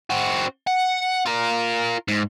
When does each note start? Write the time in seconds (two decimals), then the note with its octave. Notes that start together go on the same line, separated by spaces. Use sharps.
0.10 C4 F#4
0.67 F#5
1.26 F4 A#4
2.08 G#2